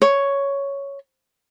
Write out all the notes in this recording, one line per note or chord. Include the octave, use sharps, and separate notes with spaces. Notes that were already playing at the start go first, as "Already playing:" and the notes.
C#5